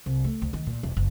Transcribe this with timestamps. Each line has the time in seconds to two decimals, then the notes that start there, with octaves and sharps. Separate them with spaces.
0.06 C2
0.24 A3
0.42 D2
0.53 D#3
0.67 A#2
0.83 E1
0.97 F#1